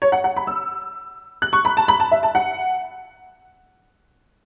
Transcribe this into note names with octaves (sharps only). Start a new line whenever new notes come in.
C#5
F#5
F#5
B5
E6
F#6
C#6
B5
A5
B5
A5
E5
A5
F#5